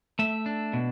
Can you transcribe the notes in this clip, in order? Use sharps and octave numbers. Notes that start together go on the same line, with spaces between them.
A3 E5
D4
B2